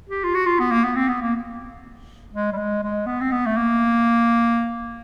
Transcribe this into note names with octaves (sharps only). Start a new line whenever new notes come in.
G4
F4
F#4
F4
B3
A#3
B3
C4
B3
A#3
G#3
G3
G#3
G#3
B3
C4
B3
A3
A#3